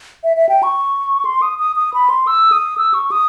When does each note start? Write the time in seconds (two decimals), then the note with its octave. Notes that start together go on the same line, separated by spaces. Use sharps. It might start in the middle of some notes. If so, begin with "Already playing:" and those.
0.24 E5
0.37 E5
0.49 G5
0.63 C#6
1.25 C6
1.42 D#6
1.59 D#6
1.76 D#6
1.94 B5
2.10 C6
2.27 E6
2.52 D#6
2.78 E6
2.94 C#6
3.11 D#6